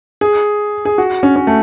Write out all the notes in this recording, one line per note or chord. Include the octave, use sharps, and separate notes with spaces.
G#4
G#4
F#4
C#4
C#4
A3